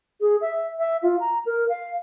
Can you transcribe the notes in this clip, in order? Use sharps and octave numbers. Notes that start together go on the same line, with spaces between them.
G#4
E5
E5
F4
A#5
A#4
F5